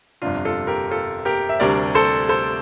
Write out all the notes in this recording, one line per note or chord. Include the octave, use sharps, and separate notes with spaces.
G1 F2 C3 G3 D4 F4
F4 A4
G4 A#4
F4 A4
G4 A#4
E5
D2 C3 G3 D4 A#4 D5
A4 C5
A4 C5